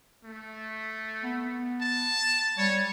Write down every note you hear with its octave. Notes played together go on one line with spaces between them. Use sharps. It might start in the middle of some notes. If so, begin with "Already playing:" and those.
A3
B3
A5
G3 C#5